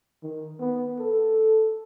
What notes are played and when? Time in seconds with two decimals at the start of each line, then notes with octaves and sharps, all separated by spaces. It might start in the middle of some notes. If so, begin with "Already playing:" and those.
0.23 D#3
0.60 B3
0.99 A4